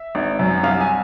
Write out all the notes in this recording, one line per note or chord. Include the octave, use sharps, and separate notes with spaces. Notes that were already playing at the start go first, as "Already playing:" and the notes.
Already playing: E5
G#1
F#2
C2 F5
G#5